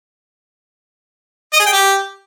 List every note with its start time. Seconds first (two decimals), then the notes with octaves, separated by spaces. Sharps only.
1.53 D#5
1.60 G#4
1.66 G5
1.73 G4